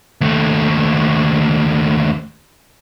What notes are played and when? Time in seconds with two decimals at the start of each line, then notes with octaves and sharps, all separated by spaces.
0.21 D#2 A3